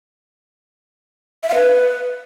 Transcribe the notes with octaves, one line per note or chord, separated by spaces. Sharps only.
E5
F5
B4